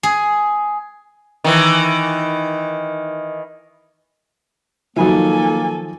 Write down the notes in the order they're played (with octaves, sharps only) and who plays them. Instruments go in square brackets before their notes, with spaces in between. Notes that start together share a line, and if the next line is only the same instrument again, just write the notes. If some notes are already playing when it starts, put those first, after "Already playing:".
[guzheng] G#4
[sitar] D#3 E3
[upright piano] D#3 F3 [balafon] F#3 D#4 F#4 [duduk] A#3 [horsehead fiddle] A4 G#5